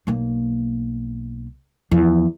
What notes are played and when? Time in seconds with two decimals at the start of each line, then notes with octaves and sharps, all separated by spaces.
0.07 B1 A#3
1.91 E2 F3